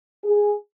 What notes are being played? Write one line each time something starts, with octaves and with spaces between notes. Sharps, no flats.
G#4